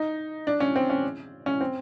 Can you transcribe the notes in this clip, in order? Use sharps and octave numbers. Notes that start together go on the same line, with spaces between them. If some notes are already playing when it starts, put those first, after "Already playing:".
Already playing: D#4
D4
C#4
C4
C#4
C#4
C4